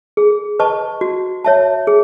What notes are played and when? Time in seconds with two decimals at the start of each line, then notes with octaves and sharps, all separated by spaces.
0.17 G#4
0.59 B4 D#5 A5 C#6
1.01 F#4
1.44 C#5 E5 A5
1.87 G#4